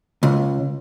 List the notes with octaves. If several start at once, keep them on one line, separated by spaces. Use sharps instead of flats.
C#2